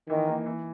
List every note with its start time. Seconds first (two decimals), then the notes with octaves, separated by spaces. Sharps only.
0.09 D#3 E3
0.27 A#3 D#4
0.46 E3